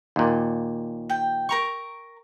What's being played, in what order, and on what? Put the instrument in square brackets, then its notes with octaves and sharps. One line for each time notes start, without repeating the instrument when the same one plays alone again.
[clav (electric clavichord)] D#2 A#2
[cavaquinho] G5
A#4 A#5 C#6